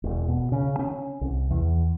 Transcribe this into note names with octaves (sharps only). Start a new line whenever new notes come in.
E1
B2
C#3
C#4
C2
E2